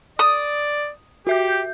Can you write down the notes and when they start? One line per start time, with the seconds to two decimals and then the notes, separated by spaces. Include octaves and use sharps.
0.19 D5 D#6
1.27 F#4 G4 E5 G6